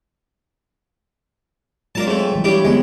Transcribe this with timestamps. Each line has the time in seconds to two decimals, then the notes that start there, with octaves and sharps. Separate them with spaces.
1.95 F#3 G#3 D4 F4 A#4 A5
2.07 G#2 A3 C4
2.32 E3 G3
2.44 G3 D4 E4 G4 C#5
2.65 D3 G#3 B3 C4